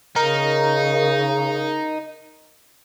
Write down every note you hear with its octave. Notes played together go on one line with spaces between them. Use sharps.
C#3 D#4 A#4